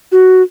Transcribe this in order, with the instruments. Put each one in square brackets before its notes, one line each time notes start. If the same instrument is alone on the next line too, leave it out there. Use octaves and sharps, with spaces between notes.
[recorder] F#4